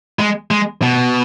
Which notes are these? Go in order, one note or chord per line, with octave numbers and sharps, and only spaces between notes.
G#3
G#3
B2